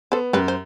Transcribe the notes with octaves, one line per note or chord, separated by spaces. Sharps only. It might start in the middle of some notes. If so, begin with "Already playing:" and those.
B3 A4 C5
F#2 G4 B4
C5